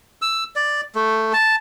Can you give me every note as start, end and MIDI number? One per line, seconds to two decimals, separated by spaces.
0.22 0.44 88
0.56 0.81 74
0.95 1.32 57
1.33 1.56 81